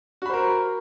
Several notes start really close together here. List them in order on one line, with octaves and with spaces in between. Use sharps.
F#4 B5 C5 A#4